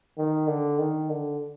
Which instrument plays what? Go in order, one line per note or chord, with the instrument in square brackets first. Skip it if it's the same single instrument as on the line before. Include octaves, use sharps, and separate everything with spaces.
[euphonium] D#3
D3
D#3
D3